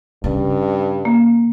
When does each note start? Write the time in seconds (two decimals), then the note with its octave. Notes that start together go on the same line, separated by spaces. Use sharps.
0.24 G2 C#3
1.05 A#3